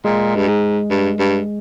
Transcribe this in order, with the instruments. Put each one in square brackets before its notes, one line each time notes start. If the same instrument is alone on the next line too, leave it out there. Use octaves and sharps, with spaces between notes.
[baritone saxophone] A#2 [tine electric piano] G#3
[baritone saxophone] G2
G#2
G2
G2